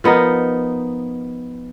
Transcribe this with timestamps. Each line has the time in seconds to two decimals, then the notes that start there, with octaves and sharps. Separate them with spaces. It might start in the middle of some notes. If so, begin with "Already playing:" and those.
0.04 F3 B3 D#4 A#4